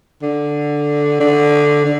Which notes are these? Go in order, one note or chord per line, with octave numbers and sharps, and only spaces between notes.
D3
D3
D3